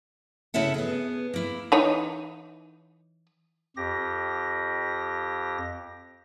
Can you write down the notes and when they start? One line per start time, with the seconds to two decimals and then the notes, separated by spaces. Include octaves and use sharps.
0.54 C#3 E4 A4 E5 F#5
0.74 B3 G#4
1.34 A#3 E4
1.72 E3 D#4 C#5
3.77 F2 G4 A#6